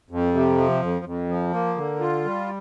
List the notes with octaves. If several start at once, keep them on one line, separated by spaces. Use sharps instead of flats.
F2
C3
F3
F2
F2
F3
A#3
D3
F4
G3